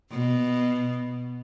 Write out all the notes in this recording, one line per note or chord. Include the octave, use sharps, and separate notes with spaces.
B2